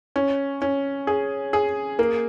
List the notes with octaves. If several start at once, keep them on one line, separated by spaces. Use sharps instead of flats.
C#4
C#4
G#4
G#4
A#3